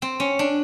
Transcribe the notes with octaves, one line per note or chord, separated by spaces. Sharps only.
C4
C#4
D4